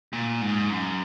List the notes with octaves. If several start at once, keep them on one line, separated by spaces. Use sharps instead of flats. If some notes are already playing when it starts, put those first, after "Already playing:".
A#2
G#2
F#2